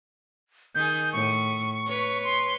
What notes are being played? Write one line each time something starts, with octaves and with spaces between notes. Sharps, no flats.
D#3 G#4 G6
A2 C#6
B4 C#5
C6